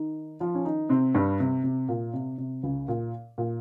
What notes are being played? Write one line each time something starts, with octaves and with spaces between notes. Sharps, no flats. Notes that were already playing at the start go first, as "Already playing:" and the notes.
Already playing: D#3 D#4
F3 F4
C#4
D#3 D#4
C3 C4
G2 G3
C3
C3
A#2
C3
C3
C#2 C#3
A#2
A#2